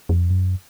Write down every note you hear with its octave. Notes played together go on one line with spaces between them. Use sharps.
F2
F#2